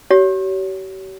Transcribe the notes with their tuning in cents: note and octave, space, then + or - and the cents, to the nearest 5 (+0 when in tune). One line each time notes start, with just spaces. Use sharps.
G4 -45 C#5 +25